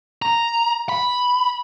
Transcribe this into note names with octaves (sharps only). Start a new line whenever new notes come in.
A#5
B5